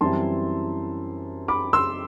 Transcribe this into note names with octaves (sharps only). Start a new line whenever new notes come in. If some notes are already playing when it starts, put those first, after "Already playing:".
F#2 E3 G3 C4 E4 A5 C6
B5 D6
C6 E6